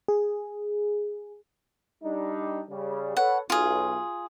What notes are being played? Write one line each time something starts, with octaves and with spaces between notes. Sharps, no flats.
G#4
G3 D4 D#4
C#3 G3
A4 B4 C#5 F#5
B1 F4 G#4